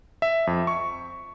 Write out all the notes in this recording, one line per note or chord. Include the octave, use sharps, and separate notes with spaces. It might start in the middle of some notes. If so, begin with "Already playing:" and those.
E5
F2
C#6